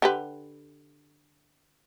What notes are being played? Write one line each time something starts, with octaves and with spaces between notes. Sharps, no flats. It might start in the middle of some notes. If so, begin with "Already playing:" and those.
D3 G4 B4